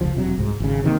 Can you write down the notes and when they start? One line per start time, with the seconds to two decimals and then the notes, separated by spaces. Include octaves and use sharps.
0.01 F1 C#2 F3
0.17 E1 C3 F#3
0.38 C2 G#2
0.60 G#1 C#3
0.84 C3 D#3 F#3 A#3